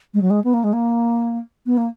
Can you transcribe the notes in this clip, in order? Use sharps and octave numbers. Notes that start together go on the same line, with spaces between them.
G#3
F#3
G#3
B3
A#3
G#3
A#3
B3
A#3